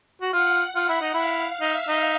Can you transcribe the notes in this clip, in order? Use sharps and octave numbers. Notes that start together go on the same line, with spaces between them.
F#4
F4 F#5
F4 F#5
E4
D#4
E4 F5
D#4 E5
D#4